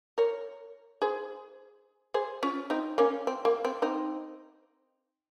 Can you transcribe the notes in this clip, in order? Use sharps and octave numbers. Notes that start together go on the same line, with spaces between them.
A#4 C#5
G#4 C5
G#4 C5
C#4 F4
C4 D#4
A#3 C#4
C4
A#3
C4
C4 D#4